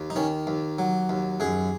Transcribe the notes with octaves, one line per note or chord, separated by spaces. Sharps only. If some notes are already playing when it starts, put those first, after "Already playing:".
Already playing: D#2
D#4
D#3 C#4
D#2
F#3
D#2
F#2 G#4